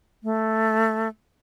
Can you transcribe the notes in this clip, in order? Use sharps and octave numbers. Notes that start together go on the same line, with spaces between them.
A3